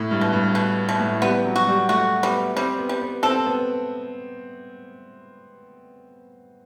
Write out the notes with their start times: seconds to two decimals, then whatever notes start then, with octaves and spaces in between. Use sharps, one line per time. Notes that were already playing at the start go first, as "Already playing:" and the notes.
Already playing: A2
0.11 G2
0.21 B2
0.33 G2
0.55 B2
0.89 B2
0.99 A2
1.22 G3 B3
1.45 F#3
1.56 F#4
1.67 G3
1.89 A3 F#4
2.23 G3 B3
2.56 G3 C4
2.78 B3
2.89 G3
3.02 B3
3.23 C4 A4
3.46 B3